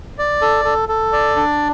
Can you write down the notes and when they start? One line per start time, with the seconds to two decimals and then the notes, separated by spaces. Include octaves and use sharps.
0.18 D5
0.42 A4
0.65 A4
0.89 A4
1.13 D5
1.36 D4